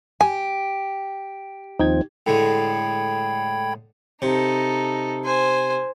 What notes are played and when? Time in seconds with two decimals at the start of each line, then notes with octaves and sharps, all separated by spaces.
0.21 G4 G#5
1.79 D#2 F3 C4 D#4 G5 G#6
2.26 A2 D3 G#3 G5 B5 G#6
4.22 C3 D#4 A4
5.24 C5 G#5